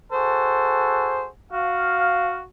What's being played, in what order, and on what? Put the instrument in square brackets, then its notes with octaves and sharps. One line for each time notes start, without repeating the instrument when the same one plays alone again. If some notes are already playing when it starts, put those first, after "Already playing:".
[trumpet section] F#4 G#4 A4 [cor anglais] C5
[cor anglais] F#4 [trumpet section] F5